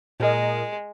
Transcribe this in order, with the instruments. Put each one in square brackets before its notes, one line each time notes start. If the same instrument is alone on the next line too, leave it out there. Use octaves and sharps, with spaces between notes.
[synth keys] A#2 A#4 D#5 [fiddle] G#3